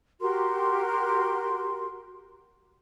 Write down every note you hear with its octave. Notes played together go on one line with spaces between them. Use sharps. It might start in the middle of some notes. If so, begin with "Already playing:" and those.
F#4 G4 A#4 C6